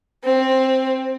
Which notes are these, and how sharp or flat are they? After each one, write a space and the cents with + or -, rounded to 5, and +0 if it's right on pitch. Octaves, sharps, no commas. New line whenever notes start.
C4 +10